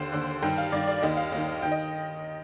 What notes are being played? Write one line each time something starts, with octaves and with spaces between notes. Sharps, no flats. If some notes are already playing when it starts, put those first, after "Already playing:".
Already playing: D#2 D3 C5
D#2 D3
G2 D#3 G5
F5
G2 D#3 D5
D5
D#2 D#3 D#5
F5
D#2 D#3
D#3 G5
D#5